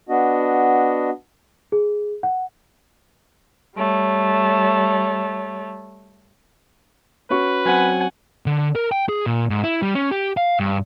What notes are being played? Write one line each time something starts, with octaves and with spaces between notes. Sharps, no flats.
B3 D4 F#4 D#5
G#4
F#5
G3 A3 C#5
C#4 F#4 B4 C#6
F#3 C4 F#5 G#5
D3
A#4
G5
G#4
A#2
G#2
E4
G3
C#4
G4
F5
G2